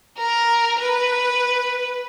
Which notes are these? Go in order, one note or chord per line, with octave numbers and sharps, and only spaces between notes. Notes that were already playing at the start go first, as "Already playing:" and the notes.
A#4
B4